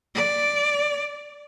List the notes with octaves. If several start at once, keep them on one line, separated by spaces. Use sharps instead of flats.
D5